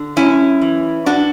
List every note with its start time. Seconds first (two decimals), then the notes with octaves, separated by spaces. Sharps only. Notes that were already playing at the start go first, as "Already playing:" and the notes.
Already playing: D3
0.16 F#2 C#4 E4
0.61 E3
1.06 A2 D4 F#4